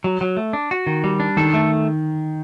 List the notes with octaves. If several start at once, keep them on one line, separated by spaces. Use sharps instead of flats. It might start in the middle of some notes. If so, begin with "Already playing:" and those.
F#3
F#3
A3
D4
F#4
D#3
G3
D4
D#3 A4
A3